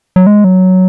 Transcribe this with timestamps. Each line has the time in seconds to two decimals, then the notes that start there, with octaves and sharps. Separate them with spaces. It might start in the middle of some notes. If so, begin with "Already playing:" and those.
0.16 F#3
0.27 G#3
0.44 F#3